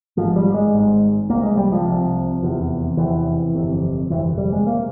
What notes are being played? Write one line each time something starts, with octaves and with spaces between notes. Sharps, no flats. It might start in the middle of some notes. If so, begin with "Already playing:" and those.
G#1 G#2 F3
G3
G#3
G#1 G#2
C2 C3 A#3
G#3
G3
F3
C2 C3
F1 E2 C3
F1 E2 C3 E3
G1 F2 C3
G1 F2 C3 E3
G3
G#3
C3 A#3